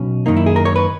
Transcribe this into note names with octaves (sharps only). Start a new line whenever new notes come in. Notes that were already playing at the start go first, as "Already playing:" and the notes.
Already playing: B1 B2 C#4
F#2 D#3 A#3 D#4
E4
G#4
A#4
C#5
B4